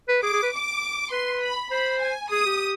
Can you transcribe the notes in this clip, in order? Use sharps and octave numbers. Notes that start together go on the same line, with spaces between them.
B4
G#4 D6
G#4
B4
D6
B4 C6
B5
C5 B5
G#5
G#4 D#6
G4